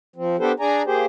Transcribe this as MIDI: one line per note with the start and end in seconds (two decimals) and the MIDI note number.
0.16 0.36 53
0.16 0.36 60
0.39 0.52 59
0.39 0.52 62
0.39 0.52 67
0.39 0.52 69
0.39 0.52 71
0.39 0.52 72
0.60 0.82 62
0.60 0.82 68
0.60 0.82 74
0.60 0.82 80
0.60 0.82 82
0.86 1.06 58
0.86 1.06 67
0.86 1.06 68
0.86 1.06 72